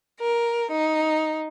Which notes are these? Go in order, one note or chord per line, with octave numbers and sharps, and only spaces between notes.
A#4
D#4